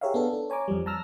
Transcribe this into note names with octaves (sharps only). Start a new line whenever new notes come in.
G4 G#4 A#4 C#5 E5 F5
B3 D4 A4
D4
C#5 G#5 A#5 D6
F2 F3 G3
A5 A#5 E6 F6 A#6